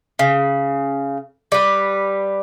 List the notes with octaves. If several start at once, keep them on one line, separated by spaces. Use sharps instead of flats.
C#3
G3 B4